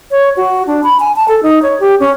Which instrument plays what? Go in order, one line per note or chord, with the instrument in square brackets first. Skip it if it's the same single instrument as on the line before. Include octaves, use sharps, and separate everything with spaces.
[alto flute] C#5
F#4
D4
B5
G#5
A5
A4
D#4
C#5
G4
C#4